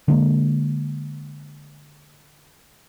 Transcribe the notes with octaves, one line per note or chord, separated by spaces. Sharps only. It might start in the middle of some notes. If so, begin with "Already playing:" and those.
D3 G#3 A#3